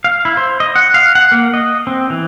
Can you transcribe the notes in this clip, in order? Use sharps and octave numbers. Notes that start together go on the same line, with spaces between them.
F5
E4
C5
D#5
F#5
F5
F#5
A#3
D#5
C4
E3